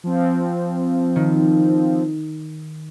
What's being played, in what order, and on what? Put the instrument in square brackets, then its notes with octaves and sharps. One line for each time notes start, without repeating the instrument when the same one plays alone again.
[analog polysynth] F3 C4
[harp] D#3